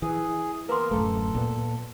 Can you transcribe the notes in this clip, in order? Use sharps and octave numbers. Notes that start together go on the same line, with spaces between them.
E3 G#4
A#3 B3 A#4 B4 C6
D1 F#2 A3 A4
A#2 B3